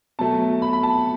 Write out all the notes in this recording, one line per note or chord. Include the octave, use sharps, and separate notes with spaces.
B2 F#3 A3 A5
B5
B5
A5